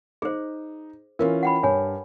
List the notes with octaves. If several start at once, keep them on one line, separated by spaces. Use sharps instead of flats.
D#4 G#4 C5
E3 C#4 F4 A#4
F#5 G5 B5
G2 C#5 G#5